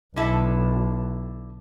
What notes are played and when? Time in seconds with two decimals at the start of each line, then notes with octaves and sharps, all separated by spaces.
0.16 B1 D3 E4 A4